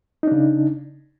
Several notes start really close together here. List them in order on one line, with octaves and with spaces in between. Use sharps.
D#4 D4 C#3